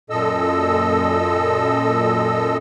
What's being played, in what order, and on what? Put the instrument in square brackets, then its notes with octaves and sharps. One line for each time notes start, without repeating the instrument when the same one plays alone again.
[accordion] F#2 A#2 A4 D#5 E6